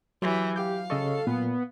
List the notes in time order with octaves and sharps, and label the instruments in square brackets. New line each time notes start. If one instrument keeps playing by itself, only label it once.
[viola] E3 G4 [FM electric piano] F#3
[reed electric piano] G4 D6 G6 [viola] F5
[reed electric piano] C#3 D#5 C#6 [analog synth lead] A4
[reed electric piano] A#2 [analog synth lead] B3